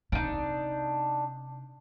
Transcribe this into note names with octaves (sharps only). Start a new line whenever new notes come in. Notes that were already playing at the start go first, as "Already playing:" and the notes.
C3 D4 D#4